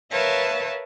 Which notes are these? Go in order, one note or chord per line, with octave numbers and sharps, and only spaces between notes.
A#4 B4 C#5 E5 F5 A5